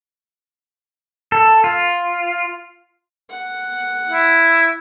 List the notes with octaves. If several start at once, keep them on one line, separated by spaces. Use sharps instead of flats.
A4
F4
F#5
E4